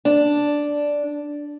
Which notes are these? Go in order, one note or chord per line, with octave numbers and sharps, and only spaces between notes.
D4